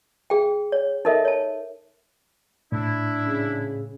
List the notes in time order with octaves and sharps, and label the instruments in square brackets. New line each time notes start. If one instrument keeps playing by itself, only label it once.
[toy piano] G#4 G5
C#5
D#4 A4 A#4 D#5 E5
C#5 A5
[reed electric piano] A2 [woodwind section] D4 E4
[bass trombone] C#3